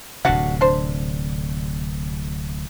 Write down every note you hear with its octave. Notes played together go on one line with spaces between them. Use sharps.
D1 C3 D4 F#4 F#5
D4 C5